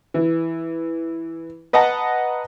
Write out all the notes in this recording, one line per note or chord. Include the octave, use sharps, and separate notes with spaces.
E3
B4 D#5 F#5 A5 A#5